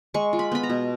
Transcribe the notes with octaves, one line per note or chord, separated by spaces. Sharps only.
G#3 C#6
F4
B5
B3 B5
A#5
B2